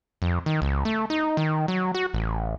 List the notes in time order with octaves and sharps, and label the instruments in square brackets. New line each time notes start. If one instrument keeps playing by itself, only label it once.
[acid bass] F2
D#3
C#2
A3
D#4
D#3
F#3
F#4
A1